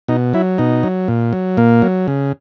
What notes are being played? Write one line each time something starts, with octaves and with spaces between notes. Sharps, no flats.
B2 D#4
F#3 E4
B2 D#4
F#3
A#2
F#3
A#2 A#3
F#3
C#3